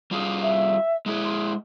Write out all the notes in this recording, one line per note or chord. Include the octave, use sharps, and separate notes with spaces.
G3 F4 G#4
E5
G#3 E4 G#4
C6